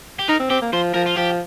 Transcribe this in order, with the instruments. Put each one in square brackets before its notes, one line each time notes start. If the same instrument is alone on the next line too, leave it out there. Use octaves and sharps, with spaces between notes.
[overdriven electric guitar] G4
[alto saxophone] D#4 [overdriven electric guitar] A#4
[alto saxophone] C4
[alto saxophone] C4 [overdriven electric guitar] G4
[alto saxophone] A#3
[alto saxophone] F3 [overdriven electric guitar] C5
[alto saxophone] F3 [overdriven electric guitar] A#4
[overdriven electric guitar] F4
[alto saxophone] F3 [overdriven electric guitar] G4